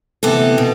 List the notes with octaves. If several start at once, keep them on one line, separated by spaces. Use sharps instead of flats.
D2 C3 E3 B3 A4
B2